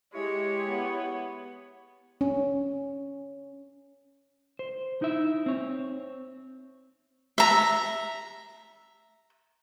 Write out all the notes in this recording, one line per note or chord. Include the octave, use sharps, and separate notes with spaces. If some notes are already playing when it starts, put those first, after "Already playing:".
G#3 E4 G4 C#5
B3
C#4
C5
D#4 E4 E5
C4 C#5
E5 A#5